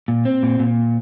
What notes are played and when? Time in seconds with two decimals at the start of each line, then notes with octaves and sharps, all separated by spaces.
0.08 A#2
0.25 C4
0.43 A#2
0.59 A#2